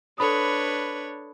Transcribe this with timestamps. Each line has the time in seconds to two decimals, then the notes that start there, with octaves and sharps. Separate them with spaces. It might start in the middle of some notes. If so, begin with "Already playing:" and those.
0.18 D4 A4 B4 C#5 B5 D#6